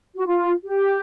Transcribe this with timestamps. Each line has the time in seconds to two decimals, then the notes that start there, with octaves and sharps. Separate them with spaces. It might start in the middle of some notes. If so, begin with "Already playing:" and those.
0.15 F#4
0.26 F4
0.64 G4